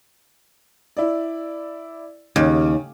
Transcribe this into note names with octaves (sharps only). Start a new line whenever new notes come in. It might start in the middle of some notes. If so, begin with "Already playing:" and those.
E4 D5
D#2 C#3